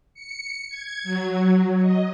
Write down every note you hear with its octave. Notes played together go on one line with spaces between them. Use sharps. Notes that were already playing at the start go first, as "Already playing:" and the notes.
C#7
G#6
F#3
D#5